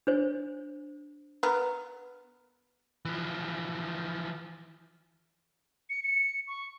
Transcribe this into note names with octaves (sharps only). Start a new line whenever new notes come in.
D4 C5
B3 A#4
E3 F3
C#7
C#7
C#6